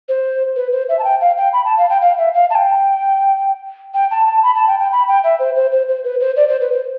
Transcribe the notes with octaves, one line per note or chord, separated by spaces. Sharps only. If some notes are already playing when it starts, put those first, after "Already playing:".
C5
B4
C5
E5
A5
G5
F5
G5
B5
A5
F5
G5
F5
E5
F5
A5
G5
G5
A5
A5
B5
A5
G5
G5
B5
G5
E5
C5
C5
C5
C5
B4
C5
D5
C5
B4
C5